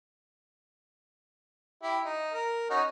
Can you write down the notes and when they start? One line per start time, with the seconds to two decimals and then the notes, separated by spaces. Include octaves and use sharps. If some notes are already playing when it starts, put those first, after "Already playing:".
1.83 E4 G4
2.06 D#4
2.33 A#4
2.70 C#4 D#4 F#4